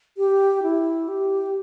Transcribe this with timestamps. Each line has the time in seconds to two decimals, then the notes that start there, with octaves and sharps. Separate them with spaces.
0.18 G4
0.63 E4
1.08 G4